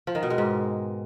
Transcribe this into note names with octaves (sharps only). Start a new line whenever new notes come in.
F3
D#3
B2
G#3
G#2